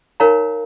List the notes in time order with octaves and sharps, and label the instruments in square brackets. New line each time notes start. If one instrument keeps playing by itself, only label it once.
[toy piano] D#4 A#4 C#5 F5 A#5